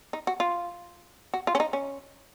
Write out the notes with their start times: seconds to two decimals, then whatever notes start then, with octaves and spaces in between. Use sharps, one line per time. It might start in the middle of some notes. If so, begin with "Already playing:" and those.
0.13 D#4
0.27 F#4
0.40 F4
1.34 F#4
1.47 F4
1.55 C#4
1.60 D#4
1.73 C#4